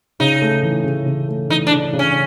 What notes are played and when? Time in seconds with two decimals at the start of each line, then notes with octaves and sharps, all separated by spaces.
0.20 C#3 D#4
0.42 A3
0.63 E3
0.84 C#3
1.06 C#3
1.29 A3
1.49 E3 D#4
1.67 D4
1.71 C#3
1.93 C#3
1.99 C#4